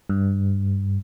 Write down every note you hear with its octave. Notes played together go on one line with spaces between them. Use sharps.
G2